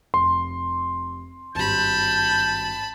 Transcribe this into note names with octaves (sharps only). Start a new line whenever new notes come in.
F1 C6
G#1 G2 G4 A5 B5 G6